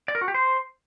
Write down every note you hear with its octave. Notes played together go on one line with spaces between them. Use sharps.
D5
A#4
F#4
G4
C5